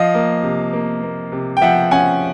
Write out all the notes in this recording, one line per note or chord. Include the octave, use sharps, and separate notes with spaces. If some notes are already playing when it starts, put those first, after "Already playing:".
Already playing: F3 D#5 F5
A#3
C3
A#3
A#3
C3
G5
F3 E5 F#5
C#4 F#5 G#5